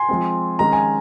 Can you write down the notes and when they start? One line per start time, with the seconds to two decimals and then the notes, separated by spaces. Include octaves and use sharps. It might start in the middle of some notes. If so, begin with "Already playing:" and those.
Already playing: G#5 C6
0.09 F3 G#3 C4
0.59 D#3 G#3 C#4 A#5
0.73 G#5